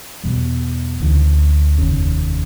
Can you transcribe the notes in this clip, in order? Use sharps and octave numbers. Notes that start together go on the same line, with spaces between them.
E2 B2 G3
D2 C#3 E3
F1 D#2 C#3